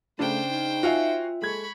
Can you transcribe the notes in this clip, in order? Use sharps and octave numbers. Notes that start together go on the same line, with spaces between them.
C#3 A3 D4 C5 G5
D#4
F4 F#4 E5 F5 G#5
G#3 A4 B5 C#6 G#6